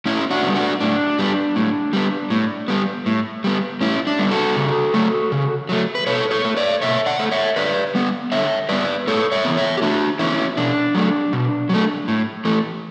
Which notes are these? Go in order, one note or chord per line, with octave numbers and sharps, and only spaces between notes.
A2 C#4 E4
D4 F#4
G3 B3
D4 F#4
A2 D4
G3 B3
A2
G3 B3
A2
G3 B3
A2
G3 B3
A2 C#4 E4
D4
G3 B3
F#4 A4
C#3
F#3 A3
C#3
F#3 A3
B4
B2 A4 C#5
A4 C#5
A3
B4 D5
B2 C#5 E5
D5 F#5
A3
C#5 E5
D3 B4 D5
G3 B3
D3 C#5 E5
G3 B3 B4 D5
A2 A4 C#5
C#5 E5
E3 B3
C#5 E5
G4
A2 D4 F#4
E3 B3 C#4 E4
B2 D4
F#3 A3
B2
F#3 A3
A2
E3 A3